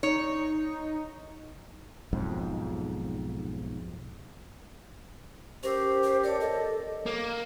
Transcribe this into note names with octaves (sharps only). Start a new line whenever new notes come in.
D#4 C#5
B1 F2 G#2
C#4 G4 A#4 C5 E6
C5
A#4 C#5 D5 A5
A4 D#5
A#3